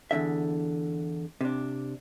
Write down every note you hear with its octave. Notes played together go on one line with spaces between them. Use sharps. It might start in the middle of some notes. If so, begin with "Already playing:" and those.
E2 G2 D3 E5
C3 D4